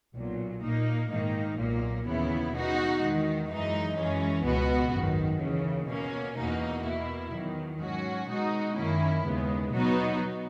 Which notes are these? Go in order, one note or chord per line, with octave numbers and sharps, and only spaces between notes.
B1 A#2 F#3
A#2 A#3 D#4
G#2 D#3 A#3 D#4
B1 A#2 F#3 A#3
D#2 C#3 E3 B3 E4
B2 G#3 D#4 F#4
E2 D#3 G#3
F#2 E3 G#3 D#4
F#2 E3 G#3 C#4
C#2 B2 G#3 B3 F#4
G#1 F#2 D#3
D#2 C#3 E3
B2 A#3 C#4
E2 B2 A#3 D#4 F#4
B2 A#3 E4
E2 D#3 F#3
G#2 F#3 C#4 F#4
B2 G#3 D#4 F#4
F#2 D#3 A#3 C#4 E4
D#2 C#3 G#3 B3
B2 F#3 B3 D#4 F#4